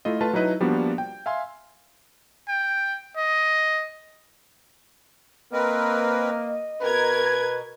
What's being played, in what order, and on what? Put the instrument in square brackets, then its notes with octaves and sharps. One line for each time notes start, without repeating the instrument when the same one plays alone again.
[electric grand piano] A3 E4 F4 D#5
A3 F4 B4 A5
F#3 D#4 E4 B4 D#5
F3 G3 A#3 B3 D4 F#4
G5
E5 F5 G#5 C6
[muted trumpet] G5
D#5
[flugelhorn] A#3 [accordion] C4 A#4 B4 [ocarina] D#5
[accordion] B2 [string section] A#4 G#6 [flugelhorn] B4